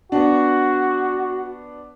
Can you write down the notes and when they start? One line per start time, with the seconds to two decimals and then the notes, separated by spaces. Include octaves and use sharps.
0.12 B3 D4 F#4